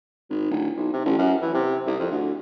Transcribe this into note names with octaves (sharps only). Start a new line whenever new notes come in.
G#1
D1
B1
C3
A1
F#2
E3
C3
C2
F2
D2